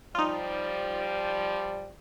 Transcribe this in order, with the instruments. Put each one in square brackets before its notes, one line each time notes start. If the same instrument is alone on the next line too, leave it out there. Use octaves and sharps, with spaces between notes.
[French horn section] F3 G3 D5 [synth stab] D#4 F4